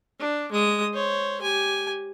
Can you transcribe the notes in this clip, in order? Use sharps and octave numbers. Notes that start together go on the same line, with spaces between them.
D4
G#3 D#6
C5 C#5
G4 G#5